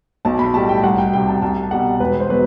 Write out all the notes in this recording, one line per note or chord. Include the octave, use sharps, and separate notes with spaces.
B1 A5
B5
A2 G3 A5
G5
C2 F#5
G5
C3 G3 G5
A5
C2 A5
B2 G3 F#5
E1 B4
C5
B2 F#3 B4